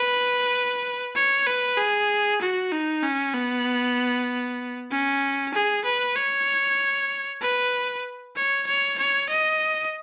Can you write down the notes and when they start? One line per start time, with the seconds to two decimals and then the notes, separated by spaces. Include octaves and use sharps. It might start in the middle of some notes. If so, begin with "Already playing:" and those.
Already playing: B4
1.15 C#5
1.46 B4
1.78 G#4
2.41 F#4
2.72 D#4
3.03 C#4
3.34 B3
4.91 C#4
5.54 G#4
5.85 B4
6.16 C#5
7.41 B4
8.36 C#5
8.67 C#5
8.98 C#5
9.29 D#5